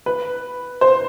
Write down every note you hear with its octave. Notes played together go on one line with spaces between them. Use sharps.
B4
C5